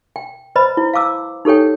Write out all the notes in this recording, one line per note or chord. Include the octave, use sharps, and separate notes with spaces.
G5
B4 C5 D#5 A#5 B5
E4
F5 A5 D6 E6
D#4 G4 A4 C#5 G5